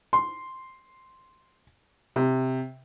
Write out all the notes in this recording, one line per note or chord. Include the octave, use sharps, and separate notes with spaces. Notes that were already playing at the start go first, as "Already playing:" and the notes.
C6
C3